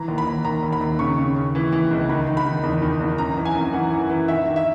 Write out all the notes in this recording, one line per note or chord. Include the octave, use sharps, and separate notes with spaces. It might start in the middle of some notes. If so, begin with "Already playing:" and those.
Already playing: E3 A#5
D#2
B5
D#2
D#2 A#5
D#2
B5
D#2
C#3 C#6
C#3
C#3
E3
E3
C#2
D#3 B5
D#3
B5
D#3
E2
D#3
E2
F#2 A#5
E3
G#5
F#2
E3 F#5
E3
E3
D#3 E5
D#3
E5